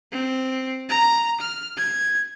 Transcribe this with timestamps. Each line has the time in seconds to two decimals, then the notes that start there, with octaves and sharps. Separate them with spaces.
0.12 C4
0.89 A#5
1.41 F6
1.77 G#6